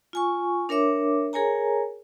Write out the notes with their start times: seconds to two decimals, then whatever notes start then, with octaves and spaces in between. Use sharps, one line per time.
0.13 F4 G#5 C#6
0.69 D4 A#4 C#5 E5 D6
1.33 G#4 A#4 C#5 G#5 A#5